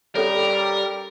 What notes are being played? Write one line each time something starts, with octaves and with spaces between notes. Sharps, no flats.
G3 C#4 A4 A#4 C#5